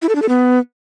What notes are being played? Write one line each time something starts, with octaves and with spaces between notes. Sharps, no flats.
E4
A4
D4
A4
B3